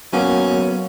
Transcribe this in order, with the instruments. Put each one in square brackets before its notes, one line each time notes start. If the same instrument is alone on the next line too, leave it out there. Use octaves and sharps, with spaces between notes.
[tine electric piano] F#3 A#3 B3 [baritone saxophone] C#4